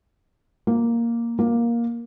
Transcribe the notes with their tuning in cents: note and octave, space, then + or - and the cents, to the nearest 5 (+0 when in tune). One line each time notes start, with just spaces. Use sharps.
A#3 +0
A#3 +10